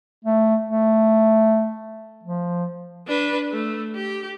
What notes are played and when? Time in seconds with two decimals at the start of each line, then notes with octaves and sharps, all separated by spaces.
0.25 A3
0.69 A3
2.23 F3
3.07 D4 B4
3.52 A3
3.95 G4